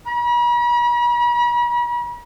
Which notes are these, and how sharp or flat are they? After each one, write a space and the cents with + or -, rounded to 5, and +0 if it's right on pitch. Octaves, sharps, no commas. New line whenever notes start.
B5 -45